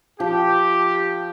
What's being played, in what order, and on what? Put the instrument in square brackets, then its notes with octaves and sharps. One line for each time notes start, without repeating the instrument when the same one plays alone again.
[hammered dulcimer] F3 [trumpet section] G4